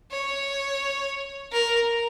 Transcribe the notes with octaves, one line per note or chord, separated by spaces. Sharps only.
C#5
A#4